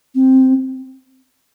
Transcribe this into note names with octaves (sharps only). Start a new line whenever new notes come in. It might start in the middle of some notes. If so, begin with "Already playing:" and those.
C4